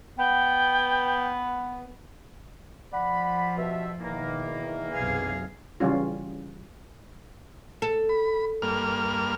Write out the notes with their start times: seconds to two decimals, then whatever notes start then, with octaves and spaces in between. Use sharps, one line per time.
0.18 B3 G5
2.93 F3 D5 F#5 B5
3.57 G2 B2 E5
4.00 E2 B2 D#3 E3 A#3
4.93 B1 F#2 C3 G#4 F5
5.80 C#3 E3 G3 C#4 F4
7.82 A4
8.09 B5
8.62 G2 A#3 F6